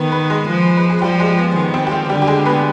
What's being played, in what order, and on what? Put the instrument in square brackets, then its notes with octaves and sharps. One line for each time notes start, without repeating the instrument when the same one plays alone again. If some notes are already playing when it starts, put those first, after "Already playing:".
Already playing: [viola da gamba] D#3 [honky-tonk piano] B3 B4
[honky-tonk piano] B3 B4
G#3 G#4
[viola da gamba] F3
[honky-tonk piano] B4
G#4
[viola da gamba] F3 [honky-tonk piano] G3 G4
[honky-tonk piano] G#3 G#4
B3
[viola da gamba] D#3 [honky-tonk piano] B3
[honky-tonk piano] C4
G4
F3 F4
[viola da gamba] D3 [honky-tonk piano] G3 G4
[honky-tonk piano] G4
G#3 G#4
B3 B4